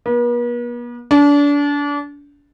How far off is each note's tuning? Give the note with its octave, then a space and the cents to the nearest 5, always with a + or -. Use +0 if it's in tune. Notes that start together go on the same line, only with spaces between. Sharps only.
B3 -45
D4 -30